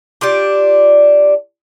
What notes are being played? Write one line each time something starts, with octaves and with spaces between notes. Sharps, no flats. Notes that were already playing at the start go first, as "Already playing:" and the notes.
D4 F4 G4 D5